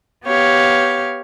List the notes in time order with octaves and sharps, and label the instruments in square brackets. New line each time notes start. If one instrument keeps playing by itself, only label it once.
[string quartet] B3 G4 C#5 F5